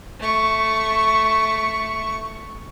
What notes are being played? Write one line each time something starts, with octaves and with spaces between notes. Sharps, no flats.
A3 C#6